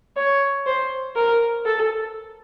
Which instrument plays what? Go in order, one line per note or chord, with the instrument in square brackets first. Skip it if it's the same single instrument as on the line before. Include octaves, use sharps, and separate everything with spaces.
[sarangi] C#5
C5
A#4
A4